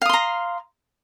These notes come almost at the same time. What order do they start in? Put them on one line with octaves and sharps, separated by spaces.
F5 D#6 C6 A#5